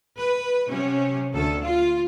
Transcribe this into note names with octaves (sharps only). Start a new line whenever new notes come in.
B4
C3 F#3 C#4
D2 A4
F4